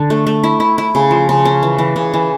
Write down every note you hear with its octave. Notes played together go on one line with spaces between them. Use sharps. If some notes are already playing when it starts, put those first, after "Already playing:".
Already playing: D3
A3
A3
E4
E4
E4
C#3
F3
C#3
C#4
E3
E3
C#3
E3